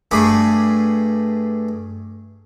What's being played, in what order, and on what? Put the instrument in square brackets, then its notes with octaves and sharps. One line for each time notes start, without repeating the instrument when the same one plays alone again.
[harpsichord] G2 A3 G#4 B5 D6